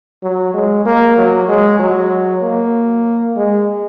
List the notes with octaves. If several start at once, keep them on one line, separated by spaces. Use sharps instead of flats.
F#3
G#3
A#3
F#3
G#3
F#3
A#3
G#3